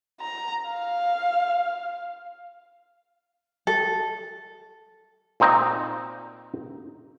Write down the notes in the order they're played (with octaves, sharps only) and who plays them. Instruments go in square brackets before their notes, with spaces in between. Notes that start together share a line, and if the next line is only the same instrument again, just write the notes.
[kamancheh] A#5
F5
[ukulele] A4
[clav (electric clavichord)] A#2 C4 D#4 G5 A#5